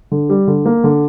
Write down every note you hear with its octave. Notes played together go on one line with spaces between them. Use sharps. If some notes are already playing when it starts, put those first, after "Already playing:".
D3
G3
D3
A#3
D3